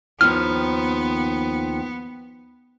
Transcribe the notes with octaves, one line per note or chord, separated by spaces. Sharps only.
D#2 D#3 F3 B3 F6